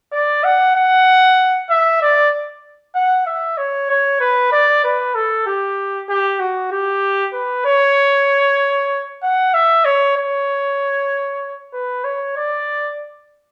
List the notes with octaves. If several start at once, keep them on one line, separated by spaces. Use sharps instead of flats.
D5
F#5
F#5
E5
D5
F#5
E5
C#5
C#5
B4
D5
B4
A4
G4
G4
F#4
G4
B4
C#5
F#5
E5
C#5
C#5
B4
C#5
D5